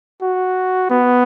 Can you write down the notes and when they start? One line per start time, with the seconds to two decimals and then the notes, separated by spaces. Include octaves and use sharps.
0.22 F#4
0.90 B3